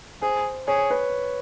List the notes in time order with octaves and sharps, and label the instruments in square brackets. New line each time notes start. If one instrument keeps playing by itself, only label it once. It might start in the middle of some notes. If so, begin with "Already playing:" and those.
[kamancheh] G#4 [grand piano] C5
[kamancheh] G#4 [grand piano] C#5
[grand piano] B4